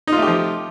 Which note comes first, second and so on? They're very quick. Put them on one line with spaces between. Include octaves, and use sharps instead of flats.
D#4 F4 A3 G4 F3